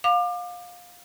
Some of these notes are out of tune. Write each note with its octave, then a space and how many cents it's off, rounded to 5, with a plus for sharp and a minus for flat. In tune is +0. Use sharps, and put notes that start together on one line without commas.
F5 +25 D6 +30